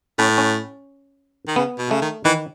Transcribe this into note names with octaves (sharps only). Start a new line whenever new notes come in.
A2 C#4
C#4
D#3
C#3 B3
B2
C#3 A3
D#3
D#3 E3